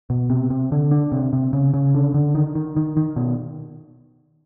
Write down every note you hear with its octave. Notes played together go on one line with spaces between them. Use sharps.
B2
C3
C3
D3
D4
C3
C3
C#3
C#3
D3
D3
D#3
D#3
D#3
D#3
B2